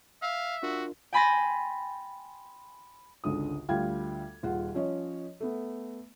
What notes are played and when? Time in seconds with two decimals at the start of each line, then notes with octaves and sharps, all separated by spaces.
0.22 E5 F5
0.63 D4 F4 F#4 A#4
1.13 G5 G#5 B5 C6 A6 A#6
3.24 G#1 C#2 D3 D#6
3.69 D2 G3 F4 F5 G5 G#6
4.43 D#1 F4 G#4 F#5
4.74 F3 C#4 C#5 D#5
5.40 A3 B3